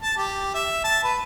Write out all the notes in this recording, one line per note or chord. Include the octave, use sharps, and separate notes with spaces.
A5
G4
E5
A5
B4